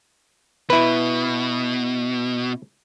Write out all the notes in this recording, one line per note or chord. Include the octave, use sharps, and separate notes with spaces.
B2 E4 B4